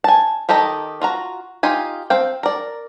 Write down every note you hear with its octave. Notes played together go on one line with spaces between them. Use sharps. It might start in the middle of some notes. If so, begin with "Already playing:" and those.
G#5 A5
D#3 G4 A4 D#5 A#5
F4 F#4 A#5
D#4 F4 G4 G#5
C4 F5 G5
A#4 D5